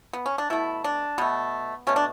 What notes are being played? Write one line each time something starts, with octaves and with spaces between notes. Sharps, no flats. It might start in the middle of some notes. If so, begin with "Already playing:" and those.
B3
C#4
D4
B2 A3 E4
D4
B2 A3 B3
B2 A3 C#4
D4